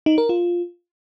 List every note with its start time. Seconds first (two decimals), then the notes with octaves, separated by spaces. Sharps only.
0.06 D#4
0.18 A#4
0.29 F4